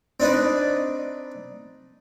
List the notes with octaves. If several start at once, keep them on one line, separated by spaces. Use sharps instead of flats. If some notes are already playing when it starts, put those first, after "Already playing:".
C4 D4 D#4 B4